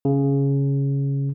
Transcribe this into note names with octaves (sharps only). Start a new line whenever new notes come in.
C#3